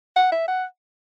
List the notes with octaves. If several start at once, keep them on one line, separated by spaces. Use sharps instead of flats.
F#5
E5
F#5